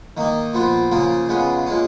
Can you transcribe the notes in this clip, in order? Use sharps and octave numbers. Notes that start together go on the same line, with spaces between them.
D#3 A#3 D#4
A#2 F3 B3 F4
C#3 F3 A#3 F4
C#3 G#3 B3 F4
A#2 G#3 C#4